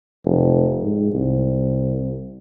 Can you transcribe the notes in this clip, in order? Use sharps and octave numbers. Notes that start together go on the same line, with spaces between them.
F1
G#2
C2